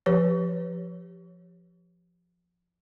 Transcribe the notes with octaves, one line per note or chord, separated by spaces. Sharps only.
F3 G4 B4 C#5